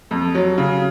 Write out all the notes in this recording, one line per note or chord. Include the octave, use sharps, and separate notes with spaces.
F2
F#3
C#3